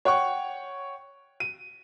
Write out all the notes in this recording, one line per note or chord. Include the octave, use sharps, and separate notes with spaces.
C#5 F#5 G5 C#6
D#7